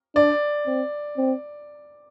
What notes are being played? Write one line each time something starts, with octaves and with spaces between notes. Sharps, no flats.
D4 D5
C4
C4